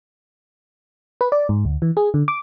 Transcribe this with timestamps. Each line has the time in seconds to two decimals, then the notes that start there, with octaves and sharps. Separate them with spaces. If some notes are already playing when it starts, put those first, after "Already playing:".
1.21 B4
1.32 D5
1.49 G#2
1.65 D2
1.82 E3
1.97 G#4
2.14 D3
2.28 D6